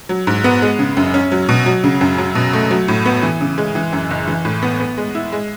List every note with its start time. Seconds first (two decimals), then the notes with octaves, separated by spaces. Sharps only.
0.09 F#3
0.27 G#2
0.44 B3
0.62 G#3
0.79 C#3
0.97 F#2
1.14 C#4
1.32 F#3
1.49 B2
1.66 F#3
1.84 C#3
2.01 F#2
2.18 F#3
2.35 B2
2.53 A3
2.71 F#3
2.88 A2
3.06 B3
3.22 E3
3.41 C#3
3.58 G#3
3.75 E3
3.93 F#2
4.10 F#1
4.28 E3
4.45 A2
4.63 B3
4.80 B3
4.98 G#3
5.15 E4
5.32 G#3